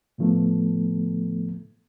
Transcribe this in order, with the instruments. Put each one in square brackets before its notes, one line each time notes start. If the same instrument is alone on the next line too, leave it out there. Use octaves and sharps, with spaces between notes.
[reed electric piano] A2 D3 F3 A3 B3 A4